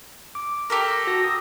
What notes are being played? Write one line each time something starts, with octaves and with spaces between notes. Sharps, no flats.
D6
G4 A4 A#4
F#4 A#6
D#6 E6